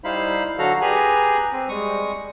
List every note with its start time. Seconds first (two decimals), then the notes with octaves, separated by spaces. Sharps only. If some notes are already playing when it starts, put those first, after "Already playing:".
0.04 G3 D#4 E4 C5 F5 B5
0.58 D3 F#3 F#4 A4 F5 A#5
0.82 G4 G#4 B4 G#5 A#5 F#6
1.52 C4
1.69 G3 G#3 C#6 D#6